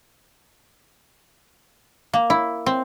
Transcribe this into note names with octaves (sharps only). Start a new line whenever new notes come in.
A#3
E4
C4